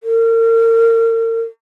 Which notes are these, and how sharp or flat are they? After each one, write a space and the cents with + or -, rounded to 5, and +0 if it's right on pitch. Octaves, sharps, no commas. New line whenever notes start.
A#4 -35